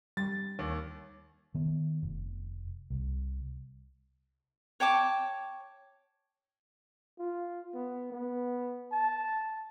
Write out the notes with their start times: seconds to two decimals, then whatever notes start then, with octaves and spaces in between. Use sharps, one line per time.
0.17 G3 A6
0.59 D#2 C#5
1.54 D#3 B3
2.03 F1
2.90 C2
4.80 C#5 G5 A5 D6
7.19 F4
7.75 B3
8.12 B3
8.92 A5